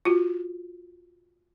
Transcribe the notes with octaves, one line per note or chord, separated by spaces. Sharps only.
F4 F#4